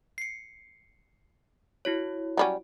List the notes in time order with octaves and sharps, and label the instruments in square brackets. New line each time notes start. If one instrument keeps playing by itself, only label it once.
[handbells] C7 C#7
E4 F#4 C#5
[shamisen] F#3 G3 C#4